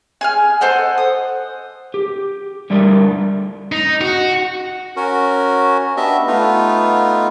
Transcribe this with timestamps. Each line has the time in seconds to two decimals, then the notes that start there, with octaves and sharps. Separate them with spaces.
0.21 G#4 G#5 F6
0.61 A4 C5 D#5 F#5
0.98 D#6
1.94 G4
2.70 D3 G3 A3 A#4 D5
3.72 D#4
4.01 F#4
4.96 C#4 F#4 A#4
5.97 B3 D4 G4 D#5 E5
6.27 A3 B3 D#4 F4